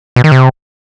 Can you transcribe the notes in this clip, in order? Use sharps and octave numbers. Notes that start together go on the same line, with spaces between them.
B2
D#3
C3